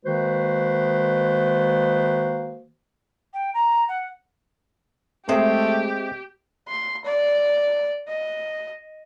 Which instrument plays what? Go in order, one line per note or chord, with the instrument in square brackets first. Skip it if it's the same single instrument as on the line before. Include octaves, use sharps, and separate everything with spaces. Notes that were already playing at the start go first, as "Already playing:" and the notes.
[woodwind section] D#3 G#3 A#3 F#4 B4 C5
[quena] G5
A#5
F#5
[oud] G#3 E5 [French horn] A3 [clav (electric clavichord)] C4 [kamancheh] G4
[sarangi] C6
D5
D#5